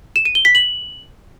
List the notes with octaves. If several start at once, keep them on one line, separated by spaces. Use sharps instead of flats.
E7
D#7
G7
B6
F#7